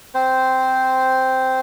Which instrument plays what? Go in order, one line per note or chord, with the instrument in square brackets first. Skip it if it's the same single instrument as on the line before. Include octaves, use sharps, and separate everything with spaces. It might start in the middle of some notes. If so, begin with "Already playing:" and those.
[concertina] C4 C5